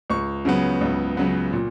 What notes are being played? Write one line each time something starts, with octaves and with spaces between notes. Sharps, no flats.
C#2 C#6
C#3 F#3 B3
C#2
C#3 F#3 B3
A#2